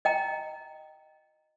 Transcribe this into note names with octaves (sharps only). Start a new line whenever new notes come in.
D#5 G5 A#5